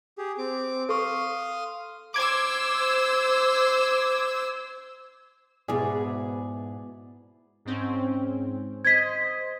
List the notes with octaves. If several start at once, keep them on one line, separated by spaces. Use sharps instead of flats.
G4 G#4
C4 D6
A4 F5 C6 C#6 D#6
C5 D6 E6 G#6
G#2 B2 B3 E4 G#4 D5
G#2 C4 C#4
C5 D#5 G#6 B6